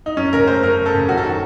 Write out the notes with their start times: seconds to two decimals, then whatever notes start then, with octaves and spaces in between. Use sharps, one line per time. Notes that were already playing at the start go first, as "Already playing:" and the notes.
0.06 D#4
0.17 F#2 C#4
0.33 C#3 A#4
0.47 A3 C5
0.63 F#2 A#4
0.79 F#2
0.86 A4
0.94 C#3
1.09 F#2 F#4
1.17 A4
1.24 D#3 F#4